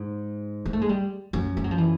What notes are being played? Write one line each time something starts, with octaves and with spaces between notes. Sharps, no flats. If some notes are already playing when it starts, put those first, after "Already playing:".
Already playing: G#2
A#3
A3
G#3
G3
F#2 F#3
G3
F#3
F3
E3